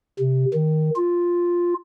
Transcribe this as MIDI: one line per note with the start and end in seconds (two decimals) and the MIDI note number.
0.19 0.45 48
0.54 0.90 51
0.96 1.74 65